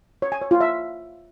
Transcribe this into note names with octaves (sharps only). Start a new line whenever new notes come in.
C#5
G#5
C#5
F4
E5